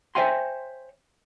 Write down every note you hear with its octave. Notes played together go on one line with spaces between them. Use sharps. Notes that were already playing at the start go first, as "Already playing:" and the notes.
C5 C#5 E5 G5 G#5 C6